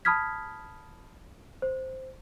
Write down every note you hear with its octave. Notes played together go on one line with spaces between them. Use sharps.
A5 B5 D#6 F6 G#6 B6
C5